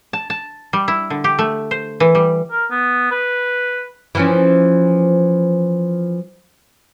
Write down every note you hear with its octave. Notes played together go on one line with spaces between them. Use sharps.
A5
A5
G3
E4
D3
G4
A3
C5
E3
G3
A#4
B3
B4
E3 F3 C#4